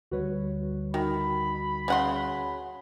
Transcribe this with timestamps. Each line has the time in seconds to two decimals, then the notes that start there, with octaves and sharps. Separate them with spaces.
0.11 D2 D3 G3 F#4 B4 C#5
0.94 D#3 F#4 B5
1.88 C#3 F#5 C6